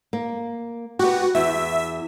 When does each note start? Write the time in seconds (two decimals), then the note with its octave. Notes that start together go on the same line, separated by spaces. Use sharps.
0.13 A#3
0.99 B3 F#4 G4
1.35 E2 E5